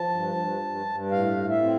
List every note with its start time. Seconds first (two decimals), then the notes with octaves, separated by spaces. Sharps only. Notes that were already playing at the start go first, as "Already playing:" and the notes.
Already playing: F3 A5
0.10 G2
0.35 G2
0.61 G2
0.86 G2
1.11 A2 F5
1.36 A2
1.49 E5
1.61 C4